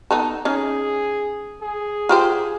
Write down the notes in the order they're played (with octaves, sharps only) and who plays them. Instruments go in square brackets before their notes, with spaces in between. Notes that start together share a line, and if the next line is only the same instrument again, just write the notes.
[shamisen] B3 D#4 A4
[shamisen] C#4 D#4 [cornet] G#4
[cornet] G#4
[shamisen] F4 G4 C5